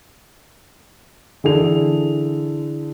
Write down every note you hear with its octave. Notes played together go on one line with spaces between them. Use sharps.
D3 E3 G#4 A4 F7